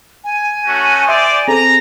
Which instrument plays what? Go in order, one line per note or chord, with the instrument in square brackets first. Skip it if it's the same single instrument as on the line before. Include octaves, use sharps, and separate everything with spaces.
[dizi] G#5
[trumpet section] A3 C#4 F#4
[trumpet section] G4 C5 D5 [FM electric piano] E5 C6 D#6
[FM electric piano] C4 G#4 A4 [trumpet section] A#5